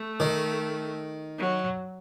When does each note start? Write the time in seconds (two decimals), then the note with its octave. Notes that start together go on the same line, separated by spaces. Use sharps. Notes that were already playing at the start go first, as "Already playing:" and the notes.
Already playing: A3
0.20 D#3
1.38 F#3